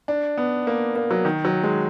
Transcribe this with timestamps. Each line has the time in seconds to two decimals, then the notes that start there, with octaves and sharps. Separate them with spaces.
0.08 D4
0.37 B3
0.67 A#3
0.96 A#3
1.11 F#3
1.25 D#3
1.45 F#3
1.63 G#3